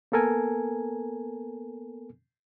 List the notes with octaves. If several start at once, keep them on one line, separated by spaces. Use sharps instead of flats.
A#3 B3 A4 A#4 G#5